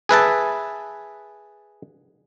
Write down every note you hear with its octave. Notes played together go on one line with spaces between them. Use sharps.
G#4 B4 E5 A5